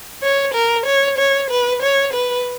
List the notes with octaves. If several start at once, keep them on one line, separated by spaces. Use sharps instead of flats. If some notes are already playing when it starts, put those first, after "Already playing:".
C#5
A#4
C#5
C#5
B4
C#5
B4